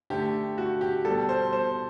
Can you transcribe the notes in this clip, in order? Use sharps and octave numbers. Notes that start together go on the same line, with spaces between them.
D3 A3 G4
F#4
G4
B2 G3 A4
C5
C5